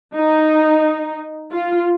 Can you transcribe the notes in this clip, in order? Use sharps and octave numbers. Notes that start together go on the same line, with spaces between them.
D#4
F4